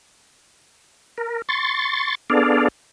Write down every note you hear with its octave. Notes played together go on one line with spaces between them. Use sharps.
A#4
C6 C#6 A6
B3 D4 G#4 A4 D5 F5